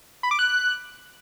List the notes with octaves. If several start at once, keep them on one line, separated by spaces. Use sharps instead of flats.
B5
D6
F#6